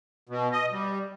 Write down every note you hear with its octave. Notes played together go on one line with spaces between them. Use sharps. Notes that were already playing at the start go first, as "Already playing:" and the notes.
B2
D#5
G3